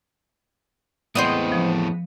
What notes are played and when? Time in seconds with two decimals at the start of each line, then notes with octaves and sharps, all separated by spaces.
1.15 E2 A2 G#3 B3 C4 C5 C#5 D#5
1.52 F3